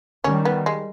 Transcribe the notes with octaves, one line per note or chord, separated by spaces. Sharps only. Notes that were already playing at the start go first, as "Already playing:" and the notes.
D#3 G3 C#4
B3
G#3